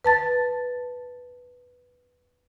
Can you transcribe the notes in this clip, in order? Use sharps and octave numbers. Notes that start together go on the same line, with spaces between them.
B4 A5 A6